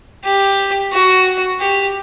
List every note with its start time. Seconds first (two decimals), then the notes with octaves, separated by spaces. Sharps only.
0.25 G4
0.93 F#4
1.60 G4